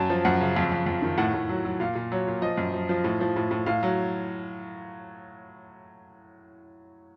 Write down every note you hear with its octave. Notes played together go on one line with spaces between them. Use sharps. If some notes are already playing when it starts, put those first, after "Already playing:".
Already playing: F#2 F#3 A5
F3
F#2 F#5
C#3
F2
F2
F2
D#3
A2 F#5
A2
F#3
F#3
A#2 F5
A#2
F#3 C#5
A#2
F3 D#5
F#2
F3
F3
A2
F3
A2
A2
A2 F5
F#3